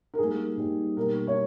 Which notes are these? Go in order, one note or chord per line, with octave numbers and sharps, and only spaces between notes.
A#4
G#2 G3 A#3 G#4
G#2 G3 A#3
B1 B2 G3 A#3 A#4
C#5